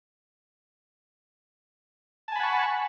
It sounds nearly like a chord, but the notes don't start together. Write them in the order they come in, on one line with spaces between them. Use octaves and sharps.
A5 G#5 B5 F#5 C#6